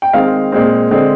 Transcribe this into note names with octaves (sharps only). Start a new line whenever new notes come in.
G5
D#3 G#3 C4 F5
A#2 G#3 C4
D3 G#3 C4